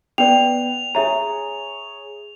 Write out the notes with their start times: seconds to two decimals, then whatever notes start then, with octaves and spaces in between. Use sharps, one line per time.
0.18 B3 D5 G5 F7
0.95 G#4 C#5 E5 A#5